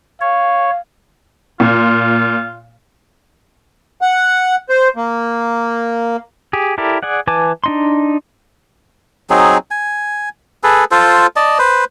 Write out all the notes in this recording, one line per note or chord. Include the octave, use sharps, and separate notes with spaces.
C#5 F5
A#2 F4
F#5
C5
A#3
G4 G#4
E4 G4 A4 A#4 D5
G#4 D5 F#5
E3 B4 G#5 A5 D6
D4 D#4 C6
F#3 C4 D#4 G#4
G#5
G#4 A4 B4
F4 A4 C5
D5 D#5 A5
B4 C5